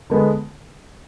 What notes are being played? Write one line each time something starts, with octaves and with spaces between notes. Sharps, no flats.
D3 G#3 B3